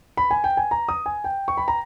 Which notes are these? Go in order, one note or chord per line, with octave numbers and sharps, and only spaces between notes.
B5
G#5
G5
G#5
A#5
D#6
G#5
G5
C#6
B5
A#5